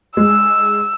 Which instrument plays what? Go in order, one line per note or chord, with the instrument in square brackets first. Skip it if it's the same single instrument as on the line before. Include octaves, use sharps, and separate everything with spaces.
[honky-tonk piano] G#3 [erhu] E6